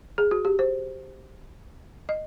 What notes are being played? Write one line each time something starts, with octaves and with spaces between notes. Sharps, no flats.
G#4
F#4
G4
C5
D#5